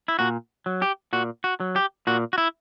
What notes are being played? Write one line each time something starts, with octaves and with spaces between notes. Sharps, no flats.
E4
A#2 F#4
F#3
G4
A#2 F#4
F#4
F#3
G4
A#2 F#4
F#4
E4